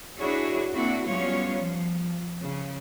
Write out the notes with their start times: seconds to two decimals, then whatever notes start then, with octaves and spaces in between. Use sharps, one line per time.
0.19 D4 E4 F#4 G#4 C#5
0.75 A#3 C4 D4 E4 F#4
1.06 F#3 G3 B3 C#4 F4 C#5
1.58 F3
2.41 C#3